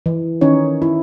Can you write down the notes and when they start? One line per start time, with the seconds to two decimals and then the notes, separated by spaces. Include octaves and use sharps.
0.06 E3
0.41 D#3 C#4 D#4 C#5
0.82 E4